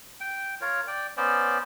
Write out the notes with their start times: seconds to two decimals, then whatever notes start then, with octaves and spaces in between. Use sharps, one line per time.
0.20 G5
0.61 F4 A#4 C#5
0.87 D5 G5
1.17 B3 C#4 C5 D5